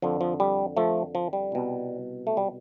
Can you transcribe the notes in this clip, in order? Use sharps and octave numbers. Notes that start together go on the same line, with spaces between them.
F2 D3 F3
F3
G3
F3 A3
F3
G3
C2 B2
A3
G3